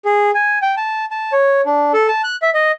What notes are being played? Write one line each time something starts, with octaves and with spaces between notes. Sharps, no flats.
G#4
G#5
G5
A5
A5
C#5
D4
A4
A5
F#6
E5
D#5